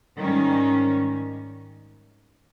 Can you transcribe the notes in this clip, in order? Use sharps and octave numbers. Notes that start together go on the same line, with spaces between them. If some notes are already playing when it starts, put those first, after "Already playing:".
G#2 D#3 G3 C#4